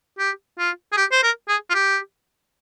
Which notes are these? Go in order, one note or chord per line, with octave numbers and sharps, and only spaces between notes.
G4
F4
G#4
G4
C5
A#4
G#4
F4
G4